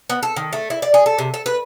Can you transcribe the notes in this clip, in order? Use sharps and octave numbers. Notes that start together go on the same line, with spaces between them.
B3
A4
D#3
A3
E4
D5
G#4
A4
C3
A4
B4